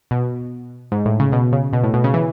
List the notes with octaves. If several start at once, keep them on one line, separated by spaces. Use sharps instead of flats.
B2
G#2
A2
C#3
B2
C#3
B2
A2
B2
C#3
E3